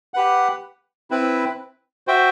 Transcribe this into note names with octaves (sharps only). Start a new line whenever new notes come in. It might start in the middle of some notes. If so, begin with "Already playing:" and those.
G4 B4 F#5
C4 E4 B4
F#4 C5 E5 G5